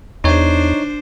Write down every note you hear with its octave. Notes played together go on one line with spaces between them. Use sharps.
E2 D4 D#4 C5 C#5